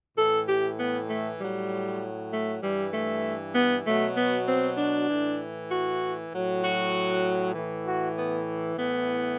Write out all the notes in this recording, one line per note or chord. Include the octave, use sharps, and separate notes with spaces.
A2 E3 A4
G4
B3
A3
A2 F#3 G3
A3
G2 E3 G3
A3
B3
B2 F#3 A3
B3
C4
D4
A2 E3
F#4
A2 F#3
F#4
A2 E3
F#4
B3
A2 E3 B3